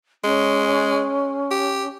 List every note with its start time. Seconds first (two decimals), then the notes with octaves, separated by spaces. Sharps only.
0.24 G#3 C#4
1.51 G4